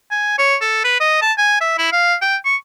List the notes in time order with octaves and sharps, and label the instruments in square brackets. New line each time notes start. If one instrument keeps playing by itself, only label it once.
[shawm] G#5
C#5
A4
B4
D#5
A5
G#5
E5
E4
F5
G5
C#6